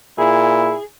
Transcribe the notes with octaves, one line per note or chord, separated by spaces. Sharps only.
A#2 E4 G#4